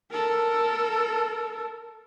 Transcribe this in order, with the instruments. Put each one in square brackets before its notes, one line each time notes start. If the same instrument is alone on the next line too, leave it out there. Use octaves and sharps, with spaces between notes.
[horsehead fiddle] A4 A#4